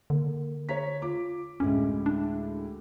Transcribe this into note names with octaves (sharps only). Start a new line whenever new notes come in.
D3 A#3
C#5 A#5 B6
F4 D6
D2 A2 G#3 C#4
D4